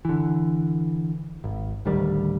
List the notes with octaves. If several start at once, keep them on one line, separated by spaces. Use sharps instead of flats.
D3 E3
G#1
D1 D2 D#3 G3